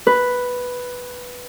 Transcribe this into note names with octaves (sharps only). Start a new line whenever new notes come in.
B4